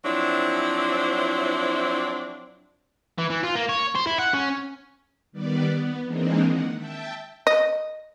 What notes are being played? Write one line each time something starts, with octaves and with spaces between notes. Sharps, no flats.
F3 F#3 C4 D4 E4
E3
E3
F4
A#3
C#5
C5
E4
F#5
C#4
D#3 G3 B3 B4 D5
B3
E3 G#3 A#3 C4 D4 D#4
D#3 F#5
E5 G5 A5
D#5